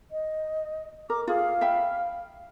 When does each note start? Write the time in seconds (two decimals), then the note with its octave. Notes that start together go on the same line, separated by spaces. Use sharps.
0.11 D#5
1.10 A#4 D6
1.28 F4 G#4 F5
1.61 E5 G5 B5